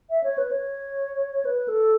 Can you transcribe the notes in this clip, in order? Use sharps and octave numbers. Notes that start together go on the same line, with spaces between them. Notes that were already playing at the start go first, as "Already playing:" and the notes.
E5
C#5
B4
C#5
B4
A4